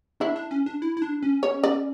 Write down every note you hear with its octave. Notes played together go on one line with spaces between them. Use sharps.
D4 E4
D4
C#4
D4
E4
E4
D4
C#4
C#5
D5